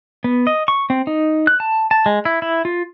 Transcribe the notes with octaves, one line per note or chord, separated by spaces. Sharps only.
B3
D#5
C#6
C4
D#4
F#6
A5
A5
G#3
E4
E4
F4